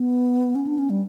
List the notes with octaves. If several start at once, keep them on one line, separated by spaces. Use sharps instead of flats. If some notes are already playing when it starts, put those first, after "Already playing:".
Already playing: B3
C#4
D4
C#4
G3